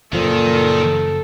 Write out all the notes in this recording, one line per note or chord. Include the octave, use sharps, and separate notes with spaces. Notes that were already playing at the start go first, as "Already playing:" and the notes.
F#1 A#2 D#3 F3 A4